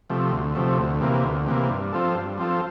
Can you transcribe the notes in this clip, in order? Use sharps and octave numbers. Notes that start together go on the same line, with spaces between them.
C3 F3 A3
D2
C3 F3 A3
D2
C3 E3 A#3
D2
C3 E3 A#3
G2
F3 C4 F4 A4
G2
F3 C4 F4 A4